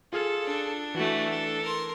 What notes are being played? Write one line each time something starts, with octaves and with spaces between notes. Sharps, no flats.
F4 G#4 A4 F6
D4
E3 A3 F#4
A4
A#4 C6